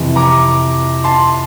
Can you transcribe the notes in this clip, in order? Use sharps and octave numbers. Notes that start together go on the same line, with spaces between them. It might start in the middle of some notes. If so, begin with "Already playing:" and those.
Already playing: F2 C3 E3
A#5 D6
A5 C6